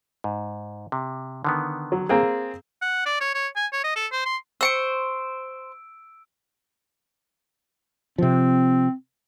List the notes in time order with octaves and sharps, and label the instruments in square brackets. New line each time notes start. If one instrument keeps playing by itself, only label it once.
[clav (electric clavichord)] G#2
C3
D3 D#3 B3
[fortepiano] F#3
A#3 C4 G#4
[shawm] F#5
D5
C#5
C#5
G#5
C#5
D#5
A4
C5
C6
[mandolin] C5 C#6 [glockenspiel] E6 D7
[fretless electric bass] C3 F3 [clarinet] C4